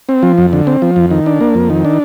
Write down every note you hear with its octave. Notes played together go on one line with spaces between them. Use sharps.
C4
F3
F2
D3
C4
F3
F2
D#3
D4
A#3
F2
D#3
D4